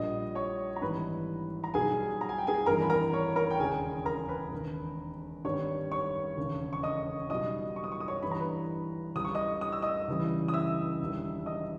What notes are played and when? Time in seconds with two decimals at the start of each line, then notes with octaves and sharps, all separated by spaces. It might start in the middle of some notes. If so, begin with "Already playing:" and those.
Already playing: A#1 A#2 G3 D#5 D#6
0.35 C#5 C#6
0.76 A#5
0.81 G#1 G#2 E3 G3 B4 B5
1.64 A#5
1.74 B1 B2 G3 G#4 G#5
2.21 A#5
2.29 G#5
2.38 G5
2.47 G#4 G#5
2.66 G#1 G2 E3 G3 A#4 A#5
2.82 B5
2.90 A#4 A#5
3.13 C#5 C#6
3.36 A#4 A#5
3.51 G5
3.60 E1 D#2 C#3 G#4 G#5
4.05 A#4 A#5
4.29 B4 B5
4.52 E1 D#2 D#3
5.44 G#1 G2 D#3 G3 C#5 C#6
5.92 C#5 C#6
6.37 E1 D#2 C#3
6.73 C#6
6.83 D#5 D#6
7.30 B1 B2 G3 D#5 D#6
7.76 C#6
7.84 D#6
7.92 C#6
8.00 D#6
8.08 C#5 C#6
8.23 G1 G2 E3 G3 B5
8.31 A#5
8.40 B4 B5
9.15 C#2 C#3 G3 D#6
9.25 C#6
9.35 D#5 D#6
9.61 D#6
9.72 E6
9.82 D#5 D#6
10.08 C#2 C#3 E3 G3
10.48 D#6
10.54 E5 E6
11.01 E1 E2 D#3 G3
11.46 D#5 D#6